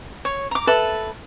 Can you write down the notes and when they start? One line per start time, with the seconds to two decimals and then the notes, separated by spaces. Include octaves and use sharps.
0.25 C#5
0.51 A#5 D6
0.67 A4 B4 E5